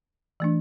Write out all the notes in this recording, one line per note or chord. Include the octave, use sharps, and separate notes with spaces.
E3 A3 D4